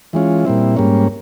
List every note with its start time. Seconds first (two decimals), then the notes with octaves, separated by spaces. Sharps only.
0.13 E3 G#3 C#4 F4
0.45 A#2 G3 C4 E4
0.77 G#2 G3 A#3 C#4